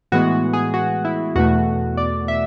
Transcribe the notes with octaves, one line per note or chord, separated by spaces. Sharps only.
A2 E3 G#3 B3 F#4
F#4
G#4
F#4
E4
E2 B2 A3 F#4
D5
E5